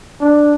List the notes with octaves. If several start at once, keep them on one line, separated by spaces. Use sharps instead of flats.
D4